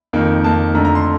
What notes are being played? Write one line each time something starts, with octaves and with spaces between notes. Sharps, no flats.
F2 D#3 A#3
F2 D#3 A#3 A5
F2 D3 A3 A#5
A#5
C6